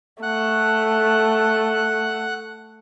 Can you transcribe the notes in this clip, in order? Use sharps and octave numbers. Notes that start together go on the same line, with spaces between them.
A3 F#5 F#6